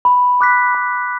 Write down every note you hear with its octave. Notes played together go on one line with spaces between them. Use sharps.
B5
D6 F#6 B6
B5